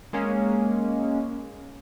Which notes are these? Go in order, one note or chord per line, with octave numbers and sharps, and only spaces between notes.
G#3 A#3 C#4